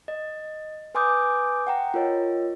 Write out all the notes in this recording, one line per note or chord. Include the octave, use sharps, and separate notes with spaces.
D#5
B4 G#5 C6 D6 D#6 G6
F#5 G5 A#5
F4 A#4 C#5 D#5